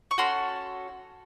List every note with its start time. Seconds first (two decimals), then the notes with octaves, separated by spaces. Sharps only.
0.11 C#6
0.18 C#4 F#4 A4 C6